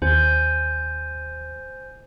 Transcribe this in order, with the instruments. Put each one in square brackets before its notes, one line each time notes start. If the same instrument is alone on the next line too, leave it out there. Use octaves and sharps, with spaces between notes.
[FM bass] D#2 [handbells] C5 G#5 G6